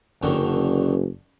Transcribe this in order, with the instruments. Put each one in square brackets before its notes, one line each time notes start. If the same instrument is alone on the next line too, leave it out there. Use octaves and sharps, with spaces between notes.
[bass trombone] F#1 [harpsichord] F#2 D3 D#3